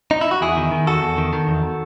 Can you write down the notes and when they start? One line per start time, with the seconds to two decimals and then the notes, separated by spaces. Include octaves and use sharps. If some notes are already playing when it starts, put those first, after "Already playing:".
0.11 D#4
0.21 E4
0.31 F#4
0.41 E2 E4 G#4
0.57 D#3
0.71 D#3
0.87 E2 F#4 A4
1.02 E2
1.18 D#3
1.33 D#3
1.48 E2